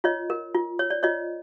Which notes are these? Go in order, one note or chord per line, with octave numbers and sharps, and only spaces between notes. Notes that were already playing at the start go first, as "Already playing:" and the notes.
F4 C#5 D#5
A#4
F4
C#5
D5
F4 C#5 D#5